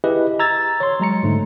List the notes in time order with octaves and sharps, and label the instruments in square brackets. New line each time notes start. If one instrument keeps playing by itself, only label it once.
[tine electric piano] E4 G4 G#4 B4 D#5
A#5 E6 G#6 A6
C#5 C6
F#3 G#3 A#5 C#7
G#2 D3 A3